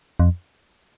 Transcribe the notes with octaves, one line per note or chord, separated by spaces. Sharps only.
F2